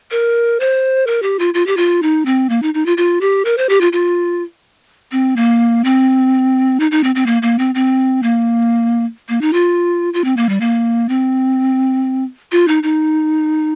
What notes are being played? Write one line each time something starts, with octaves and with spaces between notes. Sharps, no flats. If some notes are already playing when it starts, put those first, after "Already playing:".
A#4
C5
A#4
G4
F4
F4
G4
F4
D#4
C4
A#3
D#4
D#4
F4
F4
G4
A#4
C5
G4
F4
F4
C4
A#3
C4
D#4
D#4
C4
C4
A#3
A#3
C4
C4
A#3
A#3
D#4
F4
F4
C4
A#3
G3
A#3
C4
F4
D#4
D#4